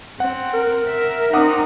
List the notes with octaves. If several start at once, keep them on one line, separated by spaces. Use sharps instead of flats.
C4 F#5
A#4
E5
C4 D#4 F#5 D6 D#6